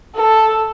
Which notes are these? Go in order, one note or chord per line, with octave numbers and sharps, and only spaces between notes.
A4